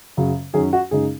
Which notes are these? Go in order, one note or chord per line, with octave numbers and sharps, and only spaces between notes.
F#2 C#3 F#3
F#2 D#3 F#3 C#4 G#4
F#4
F#2 C#3 G#3 D#4 G#4